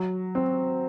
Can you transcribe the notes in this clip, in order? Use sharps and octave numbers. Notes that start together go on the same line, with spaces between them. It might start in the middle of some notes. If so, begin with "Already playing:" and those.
Already playing: F#3
C4